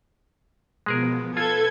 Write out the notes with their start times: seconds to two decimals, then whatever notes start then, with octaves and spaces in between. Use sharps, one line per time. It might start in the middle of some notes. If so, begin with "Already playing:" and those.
0.86 B2 F3 G#3 B3 G#4 A#4
1.37 F4 A4 B4 G#6